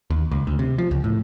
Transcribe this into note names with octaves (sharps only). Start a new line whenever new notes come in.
D#2
C#2
D2
C3
F3
C#2
A2